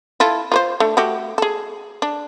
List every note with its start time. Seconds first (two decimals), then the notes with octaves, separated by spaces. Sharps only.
0.20 E4 F4 A4
0.52 F4 B4 C5
0.80 A3 D4
0.97 A3 F#4 G4
1.38 G#4 A4
2.02 D4